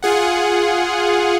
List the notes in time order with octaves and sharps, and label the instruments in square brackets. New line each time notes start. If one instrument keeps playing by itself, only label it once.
[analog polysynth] F4 G#4 F#5